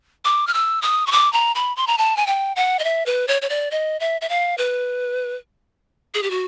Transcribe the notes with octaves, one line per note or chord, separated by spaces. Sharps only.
D6
F6
E6
D#6
C#6
D6
A#5
B5
C6
A#5
A5
G#5
G5
F#5
D#5
E5
B4
C#5
C#5
D5
D#5
E5
E5
F5
B4
G#4
G4
F#4